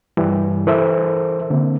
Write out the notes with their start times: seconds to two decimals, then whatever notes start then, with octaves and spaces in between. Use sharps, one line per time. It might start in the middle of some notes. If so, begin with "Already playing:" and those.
0.17 G2 E3 G3
0.67 E3 A4 A#4 C5 E5
1.50 D3 A#3 C4